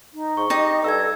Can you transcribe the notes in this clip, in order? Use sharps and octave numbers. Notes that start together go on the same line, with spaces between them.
D#4
G#2 C#6
D#4 G4 D#5
G2 A4 E6 G#6